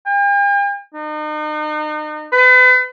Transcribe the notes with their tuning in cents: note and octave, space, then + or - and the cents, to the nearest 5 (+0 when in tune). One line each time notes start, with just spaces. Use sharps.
G5 +45
D#4 -35
B4 +40